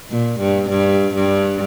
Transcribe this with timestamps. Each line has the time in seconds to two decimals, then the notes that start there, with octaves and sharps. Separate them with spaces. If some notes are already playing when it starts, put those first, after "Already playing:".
0.10 A#2
0.40 G2
0.69 G2
1.15 G2